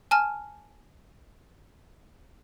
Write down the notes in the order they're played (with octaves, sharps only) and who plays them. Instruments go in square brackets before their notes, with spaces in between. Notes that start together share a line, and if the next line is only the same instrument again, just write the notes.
[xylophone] G#5 A5 F6